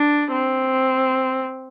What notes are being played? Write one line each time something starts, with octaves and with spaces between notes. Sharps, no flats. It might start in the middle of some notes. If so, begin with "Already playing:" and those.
Already playing: D4
C4